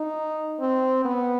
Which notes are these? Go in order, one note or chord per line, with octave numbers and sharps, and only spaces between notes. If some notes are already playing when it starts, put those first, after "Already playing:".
Already playing: D#4
C4
B3